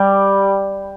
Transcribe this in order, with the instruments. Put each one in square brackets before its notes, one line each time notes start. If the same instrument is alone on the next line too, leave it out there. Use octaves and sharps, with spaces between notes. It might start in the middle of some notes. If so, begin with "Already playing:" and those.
Already playing: [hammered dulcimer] G3